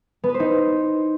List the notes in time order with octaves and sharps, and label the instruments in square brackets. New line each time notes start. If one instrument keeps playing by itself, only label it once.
[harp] B3
B4
C5
D#4